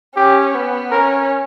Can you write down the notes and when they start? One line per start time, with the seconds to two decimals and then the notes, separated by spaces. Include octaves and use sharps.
0.16 C#4 G4
0.54 B3
0.91 C#4 A#4